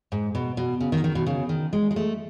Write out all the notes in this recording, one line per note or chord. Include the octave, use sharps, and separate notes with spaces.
G#2
B2
B2
C#3
D#3
D#3
B2
C#3
D#3
G#3
G#3
A3